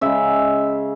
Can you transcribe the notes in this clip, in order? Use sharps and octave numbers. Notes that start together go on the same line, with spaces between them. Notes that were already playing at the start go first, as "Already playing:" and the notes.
C#3 G#3 E5